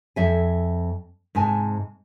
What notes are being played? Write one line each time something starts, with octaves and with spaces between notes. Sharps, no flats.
F2 E5 G#5
G#2 C3 G#5 A5